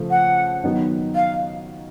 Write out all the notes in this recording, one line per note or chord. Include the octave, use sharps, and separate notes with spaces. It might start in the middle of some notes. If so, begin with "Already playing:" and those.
Already playing: C#3 F3 A3
F#5
D#3 F#3 B3 D#4
F5